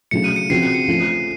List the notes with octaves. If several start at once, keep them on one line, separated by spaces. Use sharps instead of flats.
C#3 F#3 A3 C#7
D#7
C#7
C#3 F3 C4 F#4 C7
C#7
C#7
F3 A3 C#4